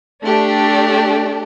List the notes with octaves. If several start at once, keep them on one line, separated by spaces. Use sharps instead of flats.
A3 D4 G4